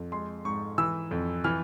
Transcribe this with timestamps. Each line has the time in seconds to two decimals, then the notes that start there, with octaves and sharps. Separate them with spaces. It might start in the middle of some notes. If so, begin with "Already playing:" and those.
Already playing: F2
0.12 G#3 C6
0.45 G#2 C#6
0.78 E3 E6
1.11 F2
1.44 E3 F6